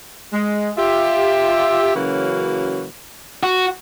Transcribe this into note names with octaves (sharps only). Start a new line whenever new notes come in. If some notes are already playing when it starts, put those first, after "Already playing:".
G#3
F4 G4 E5
C#3 E3 F#3 A#3 C#4 F#4
F#4